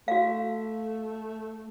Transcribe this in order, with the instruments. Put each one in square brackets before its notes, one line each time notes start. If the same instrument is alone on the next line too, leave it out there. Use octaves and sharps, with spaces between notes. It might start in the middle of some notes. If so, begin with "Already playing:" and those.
[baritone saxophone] A3 [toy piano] F#4 F5